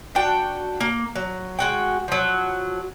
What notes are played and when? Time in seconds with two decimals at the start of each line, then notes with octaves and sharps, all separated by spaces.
0.15 D4 F#4 G5
0.80 A#3
1.16 F#3
1.59 G#3 F#4 G5
2.08 F3 F#3